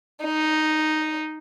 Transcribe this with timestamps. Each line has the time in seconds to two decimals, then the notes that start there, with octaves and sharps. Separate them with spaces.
0.24 D#4